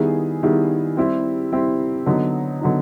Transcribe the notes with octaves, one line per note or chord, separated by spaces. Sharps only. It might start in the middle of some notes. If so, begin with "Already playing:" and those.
Already playing: D#3 G3 B3 E4 G#4
D#3 G3 B3 E4 G#4
G3 C4 E4 G4
G3 C4 E4 G4
D3 F#3 B3 D#4
D3 F#3 B3 D#4